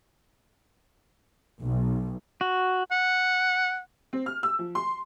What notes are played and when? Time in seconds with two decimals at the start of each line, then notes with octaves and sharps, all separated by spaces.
1.60 B1
2.41 F#4
2.91 F#5
4.13 C4
4.26 F6
4.43 E6
4.59 F3
4.75 C6